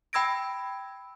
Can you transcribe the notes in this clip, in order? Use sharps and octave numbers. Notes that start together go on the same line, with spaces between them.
G5 B5 E6 G#6 A#6 D7